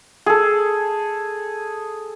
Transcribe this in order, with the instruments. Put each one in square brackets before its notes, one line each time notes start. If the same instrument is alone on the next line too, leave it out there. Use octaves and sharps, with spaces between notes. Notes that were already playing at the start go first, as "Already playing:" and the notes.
[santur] G#4 A4